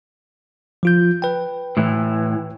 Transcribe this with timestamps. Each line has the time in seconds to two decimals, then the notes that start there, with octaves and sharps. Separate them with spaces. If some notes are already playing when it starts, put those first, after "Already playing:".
0.83 F3 F4 G6
1.22 B4 G5
1.77 A2 E3